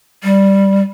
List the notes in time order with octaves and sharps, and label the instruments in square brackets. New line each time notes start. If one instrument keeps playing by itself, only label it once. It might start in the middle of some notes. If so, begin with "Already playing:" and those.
[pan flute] G3